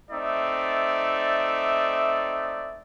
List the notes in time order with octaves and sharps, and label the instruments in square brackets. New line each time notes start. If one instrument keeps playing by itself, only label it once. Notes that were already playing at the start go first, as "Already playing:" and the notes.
[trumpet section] A3 C4 D#4 D5 E5